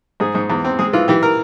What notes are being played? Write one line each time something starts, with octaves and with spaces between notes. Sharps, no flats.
G#2 G#4
G#2
E2
C4
G#3 G#4
E3 F4
E3 G4
A#4